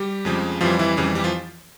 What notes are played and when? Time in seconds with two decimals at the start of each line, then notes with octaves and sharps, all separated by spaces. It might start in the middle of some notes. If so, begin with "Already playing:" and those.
Already playing: G3 G4
0.25 F2 C#3 F3 G#3
0.61 F2 E3 F3 G3 F4
0.79 E3 E4
0.97 F2 C#3 E3 G3 C#4
1.15 G3 G4
1.24 F3 F4